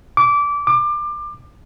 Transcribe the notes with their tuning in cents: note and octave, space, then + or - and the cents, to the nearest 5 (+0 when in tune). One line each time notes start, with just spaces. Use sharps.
D6 -20
D6 +25